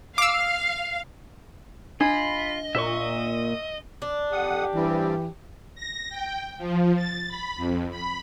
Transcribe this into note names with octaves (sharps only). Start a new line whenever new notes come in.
F5 D6 E6
D4 F4 D#5 B5
A#2 E5 C#6
D4
F2 G4 F#5 D#6
G2 E3 G3 C4
A#6
G5
F3
A6
B5
F2
B5